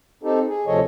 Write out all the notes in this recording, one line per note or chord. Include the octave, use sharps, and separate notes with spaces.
C4 D#4 G4 A4
G#4
D2 C3 F3 A4 C#5 D#5